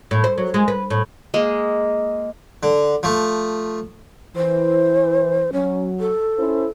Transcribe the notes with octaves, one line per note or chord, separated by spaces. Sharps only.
A2
C5
F#3
G#3
B4
A2
G#3 A#3
D3
F3 A3
E3 C5
F#3 C#4
A4
C#4 E4 C5